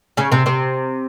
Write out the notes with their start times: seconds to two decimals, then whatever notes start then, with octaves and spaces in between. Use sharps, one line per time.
0.17 C#3 C#4
0.32 C3 C4
0.46 C3 C4